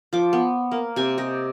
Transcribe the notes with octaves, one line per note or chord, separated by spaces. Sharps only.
F3 D6
B3
A#3
C3 G#5
G4 D#5